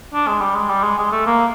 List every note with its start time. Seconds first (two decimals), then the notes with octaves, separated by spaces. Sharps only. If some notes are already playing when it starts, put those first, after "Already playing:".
0.14 D4
0.28 G#3
0.41 G3
0.56 G#3
0.70 G3
0.84 G#3
0.99 G#3
1.12 A3
1.27 A#3